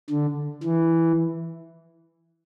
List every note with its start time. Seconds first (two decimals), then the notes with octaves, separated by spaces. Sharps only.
0.10 D3
0.64 E3